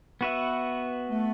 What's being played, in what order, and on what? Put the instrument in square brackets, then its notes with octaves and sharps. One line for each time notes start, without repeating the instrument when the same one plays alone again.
[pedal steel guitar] B3 F#4 B4 E5
[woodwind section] A3